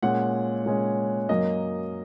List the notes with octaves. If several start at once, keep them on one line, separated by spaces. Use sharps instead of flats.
A#2 G#3 C#4 F#5
A#2 G#3 C#4
F#2 F#3 A#3 D#5